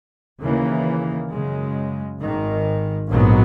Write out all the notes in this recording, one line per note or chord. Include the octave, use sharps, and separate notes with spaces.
D#2 C#3 E3 A#3
F#2 C#3 G#3
G#1 G#2 D#3
A#1 G#2 F#3 B3